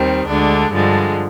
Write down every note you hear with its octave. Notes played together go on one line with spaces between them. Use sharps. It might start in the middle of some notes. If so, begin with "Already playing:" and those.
Already playing: D#2 D#3 G3 C4
D2 D3 G#3 D4
G2 D3 F3 G#3